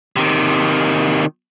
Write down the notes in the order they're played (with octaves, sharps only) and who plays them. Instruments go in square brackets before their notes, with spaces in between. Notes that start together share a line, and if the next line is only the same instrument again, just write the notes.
[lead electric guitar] C3 D#3